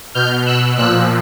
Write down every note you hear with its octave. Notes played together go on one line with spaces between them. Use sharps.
B2 F6 G6
E6 F#6
A#2 F3 E6 F#6